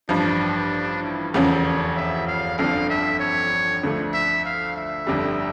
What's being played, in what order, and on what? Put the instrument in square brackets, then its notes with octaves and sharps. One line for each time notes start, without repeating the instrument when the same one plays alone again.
[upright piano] A1 G2 F3 [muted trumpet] D4
[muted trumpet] E4
[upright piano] F1 E2 C#3 F3 C#4 [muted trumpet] A#4
[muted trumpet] C#5
E5
F5
[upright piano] G1 F2 D3 F3 [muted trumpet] F5
[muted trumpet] E5
C#5
[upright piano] D2 D3 F3 A3
[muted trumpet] E5
F5
E5
[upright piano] G1 F2 D3 G3